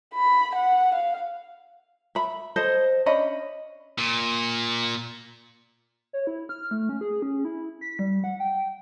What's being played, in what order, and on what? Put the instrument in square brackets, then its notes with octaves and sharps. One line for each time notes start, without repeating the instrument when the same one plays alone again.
[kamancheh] B5
F#5
F5
[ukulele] E5 B5
A4 C5 D#5
C#4 D4 D#5 B5
[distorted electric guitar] A#2
[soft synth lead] C#5
E4
F6
A3
C#4
G#4
C#4
E4
B6
G3
F#5
G5